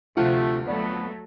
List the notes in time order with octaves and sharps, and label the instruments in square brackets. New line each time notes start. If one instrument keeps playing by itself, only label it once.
[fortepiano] D2 F4 F#5 [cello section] C3 [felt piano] F3 [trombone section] A3
[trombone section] F2 B3 [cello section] F#3 A3 [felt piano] D5